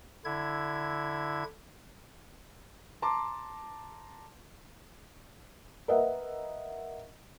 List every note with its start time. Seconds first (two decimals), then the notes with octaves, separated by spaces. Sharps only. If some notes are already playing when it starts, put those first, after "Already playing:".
0.25 D3 E4 G#6
3.02 A5 A#5 C6 D6
5.88 A#4 B4 D#5 E5 F#5